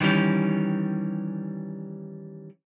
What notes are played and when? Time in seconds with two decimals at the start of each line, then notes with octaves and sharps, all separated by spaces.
0.01 D#3 E3 G3 C#4